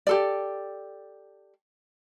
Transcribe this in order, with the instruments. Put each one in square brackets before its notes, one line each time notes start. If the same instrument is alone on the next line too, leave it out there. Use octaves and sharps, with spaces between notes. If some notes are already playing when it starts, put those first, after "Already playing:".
[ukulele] G4 A4 D5